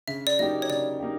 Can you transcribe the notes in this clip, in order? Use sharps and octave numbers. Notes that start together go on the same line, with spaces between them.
C#3 E5
D5
F#3 A#3 D#4 G4 D#5
C#5
C#3 D5
A#3 D#4 G4